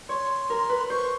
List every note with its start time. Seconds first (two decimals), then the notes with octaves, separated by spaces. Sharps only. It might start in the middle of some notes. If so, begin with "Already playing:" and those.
0.09 C#5 C6
0.50 A#4
0.70 B4
0.90 C5 C#6